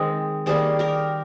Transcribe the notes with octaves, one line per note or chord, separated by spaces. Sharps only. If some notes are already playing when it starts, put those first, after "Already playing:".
Already playing: D#3 G#3 C4
D#3 G3 A#3 G#4 C5
G4 A#4